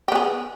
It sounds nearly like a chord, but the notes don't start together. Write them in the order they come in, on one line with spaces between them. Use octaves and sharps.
G4 B3 G#4